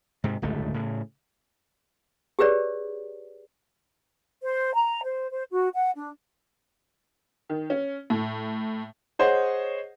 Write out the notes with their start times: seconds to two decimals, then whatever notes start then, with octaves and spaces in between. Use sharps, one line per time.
0.24 G#2 C3
0.42 D1 G1 C#2 A3
0.74 A2 C#3
2.39 G4 G#4 B4 C#5 D5
4.42 C5
4.75 A#5
5.04 C5
5.29 C5
5.51 F#4
5.73 F#5
5.95 D4
7.49 D#3
7.70 C#4
8.10 A2
9.19 G#4 C5 C#5 D#5 F#5